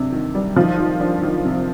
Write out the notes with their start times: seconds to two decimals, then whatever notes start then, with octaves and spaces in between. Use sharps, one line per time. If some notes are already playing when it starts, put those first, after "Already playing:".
Already playing: C3 D4
0.12 D#3
0.35 G3
0.56 D#3 F3
0.78 D#3
1.00 D4
1.22 D#3
1.45 C3